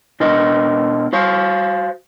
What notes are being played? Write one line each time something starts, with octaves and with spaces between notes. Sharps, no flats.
B2 D4 A#4 D#5
F#4 C5 F5